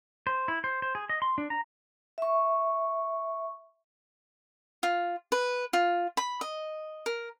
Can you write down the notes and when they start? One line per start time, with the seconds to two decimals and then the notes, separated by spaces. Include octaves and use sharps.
0.27 C5
0.48 E4
0.64 C5
0.82 C5
0.95 G#4
1.09 D#5
1.22 C6
1.38 D4
1.50 A#5
2.18 E5 C#6
4.83 F4
5.32 B4
5.73 F4
6.17 B5
6.41 D#5
7.06 A#4